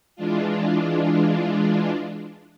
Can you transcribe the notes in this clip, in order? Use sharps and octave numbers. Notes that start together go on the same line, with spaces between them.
E3 G#3 D4 F4